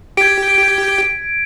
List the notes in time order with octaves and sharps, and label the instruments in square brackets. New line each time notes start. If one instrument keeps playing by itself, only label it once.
[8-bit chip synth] G4 G5 [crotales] G#6 B6 D7